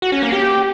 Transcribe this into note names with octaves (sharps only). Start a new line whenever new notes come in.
F#4
C#4
A#3
G4